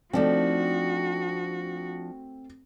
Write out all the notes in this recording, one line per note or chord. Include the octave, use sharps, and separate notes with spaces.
F3 A3 C4 D4 D#4 F#4